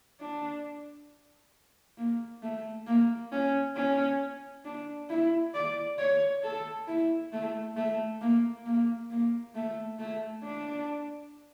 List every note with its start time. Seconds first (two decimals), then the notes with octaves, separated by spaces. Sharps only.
0.20 D4
1.97 A#3
2.42 A3
2.87 A#3
3.32 C#4
3.76 C#4
4.65 D4
5.10 E4
5.54 D5
5.99 C#5
6.43 A4
6.87 E4
7.33 A3
7.76 A3
8.21 A#3
8.65 A#3
9.10 A#3
9.55 A3
9.99 A3
10.43 D4